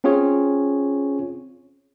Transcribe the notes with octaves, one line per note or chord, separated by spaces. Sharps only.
C4 C#4 F4 G#4 C#5